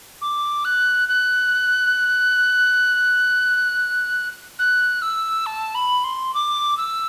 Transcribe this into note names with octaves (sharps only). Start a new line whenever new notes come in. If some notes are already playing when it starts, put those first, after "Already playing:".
D6
F#6
F#6
F#6
E6
A5
B5
C6
D6
E6